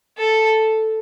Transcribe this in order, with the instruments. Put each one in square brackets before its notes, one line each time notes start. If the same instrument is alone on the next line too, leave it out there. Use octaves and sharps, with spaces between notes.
[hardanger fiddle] A4